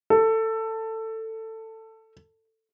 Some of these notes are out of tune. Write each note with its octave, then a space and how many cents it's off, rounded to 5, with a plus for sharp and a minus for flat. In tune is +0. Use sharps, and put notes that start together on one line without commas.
A4 +15